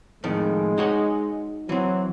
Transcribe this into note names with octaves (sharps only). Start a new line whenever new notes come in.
F2 A2 D#3 G#3
D#4 F#4 C#5
E3 F#3 C4